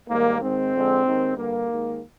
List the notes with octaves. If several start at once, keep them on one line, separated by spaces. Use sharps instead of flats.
G#2 D#3 G3 A#3
G#2 D#3 G#3 C4
F2 D3 G#3
D#2 D#3 G#3
G2 D3 G3 A#3
D#2 D#3 G#3